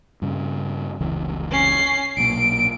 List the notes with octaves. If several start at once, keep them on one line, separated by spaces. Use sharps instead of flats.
G2 C#3
F1 C#2 E3
C#4 C7
B1 A#2 D7